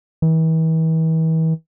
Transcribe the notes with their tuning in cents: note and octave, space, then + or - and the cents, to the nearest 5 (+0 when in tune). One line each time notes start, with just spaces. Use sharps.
E3 -40